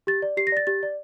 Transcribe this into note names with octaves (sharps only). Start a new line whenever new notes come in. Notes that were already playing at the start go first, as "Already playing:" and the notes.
G4 A6
D5
G4 C7
A#6
D5 A6
G4 A6
D5